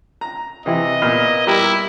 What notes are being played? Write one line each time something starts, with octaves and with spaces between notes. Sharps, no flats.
A#5
C3 E3 E4 D#5
A#2 B3 F6
G3 E4 G4 A#4